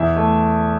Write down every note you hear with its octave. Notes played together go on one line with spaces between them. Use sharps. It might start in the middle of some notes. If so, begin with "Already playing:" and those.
Already playing: E2 E5
A3